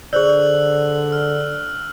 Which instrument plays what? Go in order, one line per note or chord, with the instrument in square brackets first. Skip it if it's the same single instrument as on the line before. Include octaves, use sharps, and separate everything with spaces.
[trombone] D3 [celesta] G#4 C5 D5 [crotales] E6 F#6 F#7
[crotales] F6